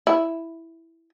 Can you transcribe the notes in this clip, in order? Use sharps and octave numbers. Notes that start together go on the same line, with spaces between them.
E4